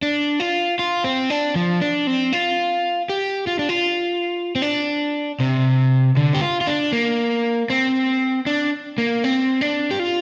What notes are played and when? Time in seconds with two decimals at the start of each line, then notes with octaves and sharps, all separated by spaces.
0.02 D4
0.40 F4
0.79 F4
1.04 C4
1.30 D4
1.55 F3
1.81 D4
2.07 C4
2.33 F4
3.09 G4
3.47 F4
3.59 D4
3.69 F4
4.56 C4
4.62 D4
5.40 C3
6.17 D3
6.34 G4
6.41 F4
6.61 F4
6.67 D4
6.92 A#3
7.70 C4
8.46 D4
8.98 A#3
9.24 C4
9.61 D4
9.91 G4
10.00 F4